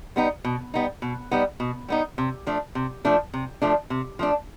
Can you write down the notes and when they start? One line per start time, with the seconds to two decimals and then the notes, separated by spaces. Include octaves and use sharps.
0.16 G3 B3 D#4
0.44 B2
0.74 G3 B3 D#4
1.02 B2
1.31 G3 B3 D#4
1.60 B2
1.88 G3 B3 D#4
2.18 C3
2.47 F3 A3 D4
2.75 C3
3.05 F3 A3 D4
3.34 C3
3.62 F3 A3 D4
3.90 C3
4.19 F3 A3 D4